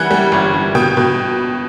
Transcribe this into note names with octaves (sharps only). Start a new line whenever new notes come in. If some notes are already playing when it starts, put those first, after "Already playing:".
Already playing: E3 G3 F#5
G3
G1
G1
B2 G5
B2